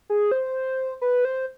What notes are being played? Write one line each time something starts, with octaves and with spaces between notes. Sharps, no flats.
G#4
C5
B4
C5